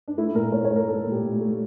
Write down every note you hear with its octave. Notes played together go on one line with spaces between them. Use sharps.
D4
A3 E4
A#2 A#4
A#2 C#5
C#5
A3
A#4
A3 A4
A4
A#2
G4
A#2
A3